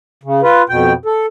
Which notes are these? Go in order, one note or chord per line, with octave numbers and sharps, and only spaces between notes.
C#3
F4 B4
F2 B2 G5
A4